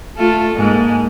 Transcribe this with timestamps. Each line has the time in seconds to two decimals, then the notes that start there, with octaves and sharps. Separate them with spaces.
0.16 A3 F4 A4
0.56 G#2 G#3 A#3